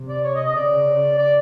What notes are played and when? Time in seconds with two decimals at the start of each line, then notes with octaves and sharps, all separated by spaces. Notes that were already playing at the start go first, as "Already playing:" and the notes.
Already playing: C3
0.09 D5
0.24 C#5
0.35 D#5
0.46 D#5
0.56 C#3 D5
1.19 D5